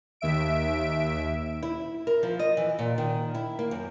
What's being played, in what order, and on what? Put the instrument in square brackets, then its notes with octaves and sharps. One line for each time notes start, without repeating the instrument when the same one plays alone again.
[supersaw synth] D#2 E5 D7
[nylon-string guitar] E4
A#4
F3
D#5
E3
A#2
D#3
E4
A#3
F#2